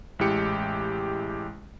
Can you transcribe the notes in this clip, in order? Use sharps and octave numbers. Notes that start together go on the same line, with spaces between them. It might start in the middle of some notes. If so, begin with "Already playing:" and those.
A1 G#3 E4 G4 C#7